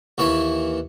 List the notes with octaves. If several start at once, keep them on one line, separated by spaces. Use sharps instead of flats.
D#2 E3 E4 C#6